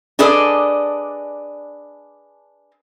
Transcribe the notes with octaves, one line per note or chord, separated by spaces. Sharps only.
D4 G#4 A4 B4 D5 D#5